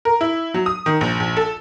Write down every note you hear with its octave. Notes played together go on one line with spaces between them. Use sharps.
A#4
E4
F#3
D#6
D#3
A#1
A#1
A4